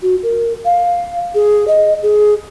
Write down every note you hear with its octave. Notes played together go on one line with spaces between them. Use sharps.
F#4
A#4
F5
G#4
D#5
G#4